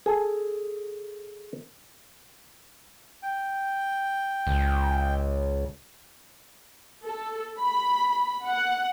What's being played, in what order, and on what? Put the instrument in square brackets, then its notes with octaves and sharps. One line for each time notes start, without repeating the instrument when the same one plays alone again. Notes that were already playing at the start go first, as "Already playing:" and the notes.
[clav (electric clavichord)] G#4 A4
[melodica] G5
[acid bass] C#2
[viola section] A4
B5
F#5